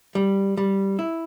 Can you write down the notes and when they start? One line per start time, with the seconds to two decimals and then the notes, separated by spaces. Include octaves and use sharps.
0.15 G3
0.57 G3
0.99 E4